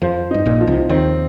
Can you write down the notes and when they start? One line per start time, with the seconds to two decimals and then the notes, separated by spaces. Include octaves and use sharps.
0.02 F2 F3 C5
0.31 G2 D#4
0.46 A#1 A#2
0.61 F3
0.67 C2 C3
0.89 D#2 D#3 C4